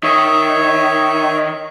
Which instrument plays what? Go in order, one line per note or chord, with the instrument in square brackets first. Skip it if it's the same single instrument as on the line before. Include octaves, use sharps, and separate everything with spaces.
[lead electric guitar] D#3 [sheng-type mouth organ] C#5 E5